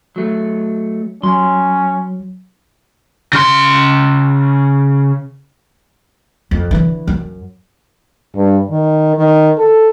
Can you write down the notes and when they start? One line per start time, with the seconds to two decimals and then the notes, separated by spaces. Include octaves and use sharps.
0.16 F#3 A3
1.23 F#3 C#4 C6
3.33 C#3 C6
6.51 F2
6.71 D3 E3
7.07 F#2
8.36 G2
8.70 D#3
9.16 D#3
9.58 A4